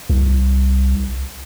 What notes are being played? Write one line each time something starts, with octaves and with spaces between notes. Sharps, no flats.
C2